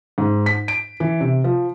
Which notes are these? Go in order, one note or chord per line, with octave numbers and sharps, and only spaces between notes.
G#2
B6
D7
E3
C3
F3